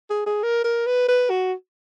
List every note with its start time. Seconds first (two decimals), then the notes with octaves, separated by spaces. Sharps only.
0.10 G#4
0.26 G#4
0.43 A#4
0.64 A#4
0.86 B4
1.08 B4
1.30 F#4